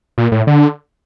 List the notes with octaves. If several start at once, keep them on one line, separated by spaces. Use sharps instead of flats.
A#2
A2
D3